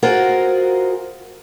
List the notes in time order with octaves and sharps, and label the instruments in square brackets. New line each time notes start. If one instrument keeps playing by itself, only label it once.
[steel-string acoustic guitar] F4 F#4 G#4 A#4 C5